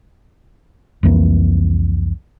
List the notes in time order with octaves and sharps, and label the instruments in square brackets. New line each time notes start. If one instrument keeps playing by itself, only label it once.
[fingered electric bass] C2 F2 E3 A#3